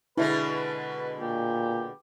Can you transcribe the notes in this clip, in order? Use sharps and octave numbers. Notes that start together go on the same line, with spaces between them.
B2 D3 G#3 E4 B4
A#2 G4